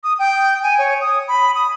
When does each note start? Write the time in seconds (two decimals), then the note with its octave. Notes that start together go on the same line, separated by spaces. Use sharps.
0.04 D#6
0.19 G5
0.63 G#5
0.79 C#5
1.01 D#6
1.28 B5
1.55 D#6